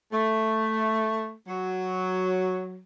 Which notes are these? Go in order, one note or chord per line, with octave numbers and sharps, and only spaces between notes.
A3
F#3